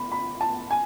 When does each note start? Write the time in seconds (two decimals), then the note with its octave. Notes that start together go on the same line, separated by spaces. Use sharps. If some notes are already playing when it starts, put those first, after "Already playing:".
Already playing: B5
0.12 B5
0.41 A5
0.71 G#5